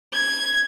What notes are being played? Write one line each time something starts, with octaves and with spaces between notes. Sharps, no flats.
G#6